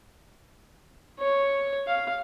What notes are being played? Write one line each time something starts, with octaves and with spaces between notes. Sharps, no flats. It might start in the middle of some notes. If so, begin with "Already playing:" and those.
C#5
F5